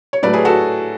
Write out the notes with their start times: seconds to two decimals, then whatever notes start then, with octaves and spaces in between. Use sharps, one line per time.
0.13 C#5
0.23 A2 F#3 A3 B4 D5
0.33 G#4 B4
0.45 F#4 A4